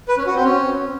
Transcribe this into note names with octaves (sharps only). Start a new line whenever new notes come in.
B4
C#4
F#4
C4
C#4